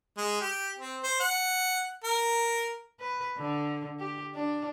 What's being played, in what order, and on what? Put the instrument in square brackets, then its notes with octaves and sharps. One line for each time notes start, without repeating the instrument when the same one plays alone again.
[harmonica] G#3
G4
C4
C5
F#5
A#4
[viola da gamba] B4
D3
G4
D4